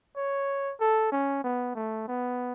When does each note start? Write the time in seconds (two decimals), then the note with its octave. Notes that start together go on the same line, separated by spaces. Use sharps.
0.16 C#5
0.80 A4
1.12 C#4
1.44 B3
1.75 A3
2.08 B3